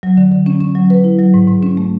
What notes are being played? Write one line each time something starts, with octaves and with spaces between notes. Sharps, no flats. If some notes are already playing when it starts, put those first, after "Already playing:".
F#3
D3
D3
C#4
C#4
F#3
B4
E4
F#3
G#2
G#2
C#4
A3